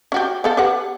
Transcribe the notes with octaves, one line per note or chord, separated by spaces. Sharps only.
C#4 F#4 G4
B3 A4 F5
G4 B4 F#5